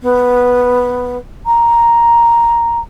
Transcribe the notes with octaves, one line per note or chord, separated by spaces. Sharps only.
B3
A#5